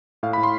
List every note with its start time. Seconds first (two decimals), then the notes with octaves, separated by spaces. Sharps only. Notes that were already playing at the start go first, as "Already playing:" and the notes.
0.23 A2 F5
0.33 A2 B5
0.43 C6